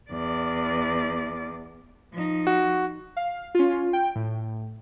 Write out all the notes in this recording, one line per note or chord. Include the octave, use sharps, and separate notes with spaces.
E2 D5
F3 D#4
F#4
F5
C#4 F4
G5
A2